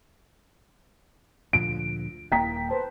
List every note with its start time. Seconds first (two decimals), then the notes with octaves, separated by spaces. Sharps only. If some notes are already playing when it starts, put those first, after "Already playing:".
1.53 D2 A#2 F3 D7
2.32 D#1 A#3 G5 A#5 B6
2.69 B4 C5 A5